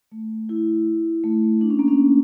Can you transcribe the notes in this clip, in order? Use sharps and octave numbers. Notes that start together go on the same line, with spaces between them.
A3
E4
A3
D4
C#4
A#3
C#4